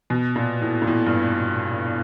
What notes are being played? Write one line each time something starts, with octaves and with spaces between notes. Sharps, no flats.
B2
A#2
A2
A#2
A2
G2